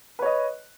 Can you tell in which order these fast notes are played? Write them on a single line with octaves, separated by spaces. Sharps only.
B4 C#5 D#5